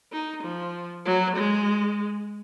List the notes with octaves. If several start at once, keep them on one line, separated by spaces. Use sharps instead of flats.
D#4
F3
F#3
G#3